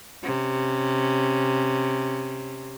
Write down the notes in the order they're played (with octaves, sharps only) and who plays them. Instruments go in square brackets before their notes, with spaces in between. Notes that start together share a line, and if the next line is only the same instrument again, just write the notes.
[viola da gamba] C3 C#4